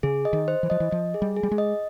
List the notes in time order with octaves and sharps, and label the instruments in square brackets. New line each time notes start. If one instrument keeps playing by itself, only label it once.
[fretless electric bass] C#3 [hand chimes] G#4
[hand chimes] D#5
[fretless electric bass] D#3
[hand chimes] C5
[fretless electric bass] E3
[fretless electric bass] F3 [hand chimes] D#5
[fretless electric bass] E3
[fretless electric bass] F3 [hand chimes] D#5
[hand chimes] G#4
[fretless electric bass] G3
[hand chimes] G#4
[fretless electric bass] G3
G#3
[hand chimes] D#5